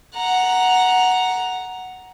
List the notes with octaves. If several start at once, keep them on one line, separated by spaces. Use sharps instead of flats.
F#5 A#5